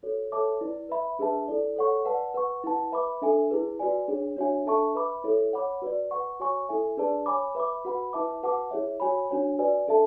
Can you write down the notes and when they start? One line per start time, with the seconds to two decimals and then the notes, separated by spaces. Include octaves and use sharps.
0.03 F#4 A4 C#5
0.32 A4 C#5 E5 A5 D6
0.61 E4 B4 D5
0.89 B4 E5 B5
1.19 D4 G#4 B4 E5 A5
1.48 E4 A4 D5
1.76 A4 C#5 F#5 C#6
2.05 B4 D5 F#5 A5
2.34 B4 F#5 C#6
2.64 E4 B4 F#5 A5
2.92 B4 E5 B5 D6
3.22 D4 A4 E5 G#5
3.51 E4 G#4 B4
3.79 F#4 B4 D5 G#5
4.08 D4 G#4 C#5
4.36 D4 F#4 C#5 E5 G#5
4.66 D4 A4 E5 A5 C#6
4.95 B4 E5 B5 D6
5.24 E4 A4 C#5 E5
5.53 C#5 F#5 B5 D6
5.82 F#4 B4 D5
6.11 B4 F#5 C#6
6.40 F#4 C#5 G#5 C#6
6.69 E4 A4 E5 G#5
6.97 D4 G#4 B4 D5 A5
7.26 C#5 G#5 B5 D6
7.55 B4 E5 B5 D6
7.85 F#4 B4 F#5 B5
8.13 E4 B4 E5 A5 D6
8.43 F#4 B4 F#5 A5 D6
8.71 E4 G#4 C#5 E5
9.00 F#4 C#5 G#5 B5
9.29 D4 F#4 C#5 G#5
9.58 F#4 B4 D5 G#5
9.88 D4 A4 E5 A5